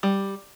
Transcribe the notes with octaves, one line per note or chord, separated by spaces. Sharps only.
G3